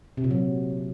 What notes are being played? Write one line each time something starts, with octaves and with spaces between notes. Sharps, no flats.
C3
A#2
F#3